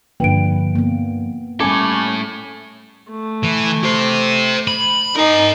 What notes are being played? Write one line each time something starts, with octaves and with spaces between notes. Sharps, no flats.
G2 D3 F3 A#3 B4 G5 D7
A#3 B3
A2 G3 C#4 A4 G#5 D6 G#6
A3
E3
G4 C5
B5
D#4 A#4 G#5